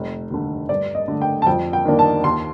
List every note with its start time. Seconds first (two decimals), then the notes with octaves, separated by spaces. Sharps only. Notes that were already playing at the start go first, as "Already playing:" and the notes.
Already playing: F1
0.30 D#2 D3
0.69 G2 D5
0.95 D#5
1.08 D3 A3
1.22 G5
1.42 A5
1.47 F2 G5
1.73 G5
1.85 D#3 A#3 D4
1.99 A5
2.24 D#2 C6